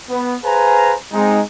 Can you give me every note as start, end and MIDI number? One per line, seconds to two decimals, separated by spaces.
0.10 0.37 59
0.44 0.94 68
0.44 0.94 71
0.44 0.94 72
0.44 0.94 77
0.44 0.94 80
0.44 0.94 82
1.12 1.41 56
1.12 1.41 60
1.12 1.41 63